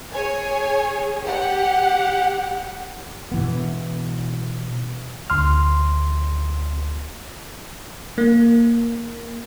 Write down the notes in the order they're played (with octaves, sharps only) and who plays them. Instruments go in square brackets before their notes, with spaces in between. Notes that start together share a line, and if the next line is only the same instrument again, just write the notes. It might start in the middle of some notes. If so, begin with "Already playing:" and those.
[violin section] G#4 C#5 G#5
G4 F#5
[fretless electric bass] B2 E3 B3
[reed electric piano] D2 C6 F6
[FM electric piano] A#3